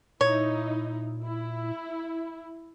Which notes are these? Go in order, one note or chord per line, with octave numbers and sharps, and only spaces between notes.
A#2 D#4 E4 C#5
E4